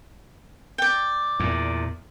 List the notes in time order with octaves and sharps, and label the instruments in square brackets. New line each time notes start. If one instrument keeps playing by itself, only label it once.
[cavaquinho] D5 G5
[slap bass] E2 A#2